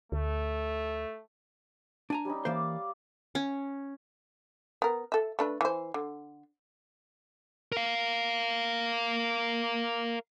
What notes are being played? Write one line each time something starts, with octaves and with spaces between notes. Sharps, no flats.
D2 A3
D4 G#5 A#5
G3 C#4 D#4
E3 A#3 C5 D5 F5
C#4
B3 A#4
A4 E5
A3 D4 B4
E3 C5
D3
A#4 F5